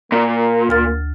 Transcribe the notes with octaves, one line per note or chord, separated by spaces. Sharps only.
A#2 A#3
D2 F6 A6